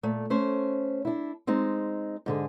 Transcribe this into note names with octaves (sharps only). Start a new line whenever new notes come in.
A#2 A3
A3 C#4 C5
D4 E4
G#3 C4 D#4
G#2 D3 G#4